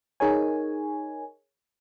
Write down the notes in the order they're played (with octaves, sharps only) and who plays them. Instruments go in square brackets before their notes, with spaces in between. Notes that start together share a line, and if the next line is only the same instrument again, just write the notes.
[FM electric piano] D#4 G#4 A#4 C#5 G#5